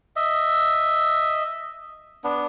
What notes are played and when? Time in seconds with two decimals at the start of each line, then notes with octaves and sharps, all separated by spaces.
0.16 D#5 E5
2.24 B3 D4